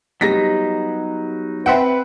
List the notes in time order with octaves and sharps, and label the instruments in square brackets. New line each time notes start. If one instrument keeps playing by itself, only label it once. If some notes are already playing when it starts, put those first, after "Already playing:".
[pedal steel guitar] F#3 B3 D#4 [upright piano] G3 A#6 B6
[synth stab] C4 E5 G5 [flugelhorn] B4 [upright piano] F#5